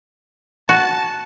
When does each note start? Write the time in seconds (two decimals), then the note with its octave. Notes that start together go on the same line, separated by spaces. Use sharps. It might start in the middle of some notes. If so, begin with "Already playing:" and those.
0.69 F#4 A5